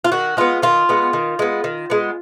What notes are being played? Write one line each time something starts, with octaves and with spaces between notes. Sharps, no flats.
F4
D#3 F#4
G#3 B3 F4
D#3 F4
G#3 B3
D#3
G#3 B3
D#3
G#3 B3